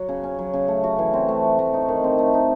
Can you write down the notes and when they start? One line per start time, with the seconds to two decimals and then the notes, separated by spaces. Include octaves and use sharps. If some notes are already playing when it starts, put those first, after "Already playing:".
Already playing: F#3 F#4
0.09 C#3
0.24 C#4
0.39 F#3
0.54 C#3
0.68 A3
0.83 F#4
0.99 E3
1.14 C4
1.28 A3
1.44 F#4
1.59 A3
1.74 D#4
1.88 D#3
2.04 C4
2.19 A3
2.34 D#4